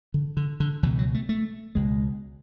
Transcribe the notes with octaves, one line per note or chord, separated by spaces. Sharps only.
D3
D3
D3
C#2 B2 E3
F#3
A3
A3
C#2 B2 G#3